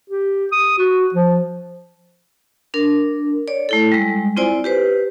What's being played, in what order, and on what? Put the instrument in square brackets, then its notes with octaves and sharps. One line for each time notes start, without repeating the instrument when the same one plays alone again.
[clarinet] G4
D#6
F#4
F3
[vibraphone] D4 A#4
C#5 D5
A3 E4 A4
G3 G#3
C4 E4 F4 C5 D5 G#5
G4 B4 C5